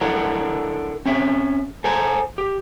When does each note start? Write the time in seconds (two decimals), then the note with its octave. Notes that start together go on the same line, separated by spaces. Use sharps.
0.01 D4 E4 A4 A#4 F#5
1.06 C4 C#4 E5
1.84 A4 C5 G#5 A#5
2.38 G4